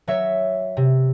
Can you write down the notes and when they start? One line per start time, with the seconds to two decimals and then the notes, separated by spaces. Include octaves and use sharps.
0.07 F#3 C#5 E5
0.77 C3